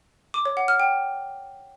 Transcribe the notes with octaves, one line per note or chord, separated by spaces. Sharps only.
D6
C#5
F#5
F6
G5